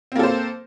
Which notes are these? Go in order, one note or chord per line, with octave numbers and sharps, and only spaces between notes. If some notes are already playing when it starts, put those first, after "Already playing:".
A#3 C4 A4 C5